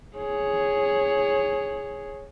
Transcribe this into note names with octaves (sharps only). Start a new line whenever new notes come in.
G#4 C#5